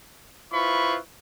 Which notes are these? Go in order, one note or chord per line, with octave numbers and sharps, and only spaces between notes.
E4 F4 B4 C5 B5 C#6